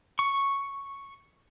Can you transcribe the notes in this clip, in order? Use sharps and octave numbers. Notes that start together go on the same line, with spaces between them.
C#6